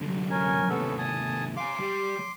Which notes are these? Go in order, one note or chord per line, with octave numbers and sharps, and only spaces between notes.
F#2 D3
C#4 A#4 G#5
D#2 C3 B3 C#4 A4
G#5 A5 D#6
F5 G#5 C6 D6
G3